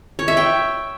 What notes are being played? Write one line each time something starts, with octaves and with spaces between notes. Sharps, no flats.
C#5
E5
G5